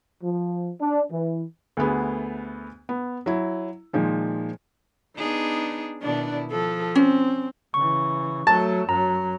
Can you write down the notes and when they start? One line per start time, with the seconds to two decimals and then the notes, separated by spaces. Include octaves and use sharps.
0.22 F3
0.79 D4
1.11 E3
1.77 D2 A3 B3 G#4
2.89 B3
3.26 F#3 E4
3.93 A#2 D#3 F3 G#3
5.17 B3 D4 D#4 G#4
6.02 B2 D#3 D4 E4 D5
6.51 F3 A4
6.95 C4 C#4
7.74 C#3 E3 C#6
8.47 F#3 A3 A5
8.89 F#2 F#3 A#5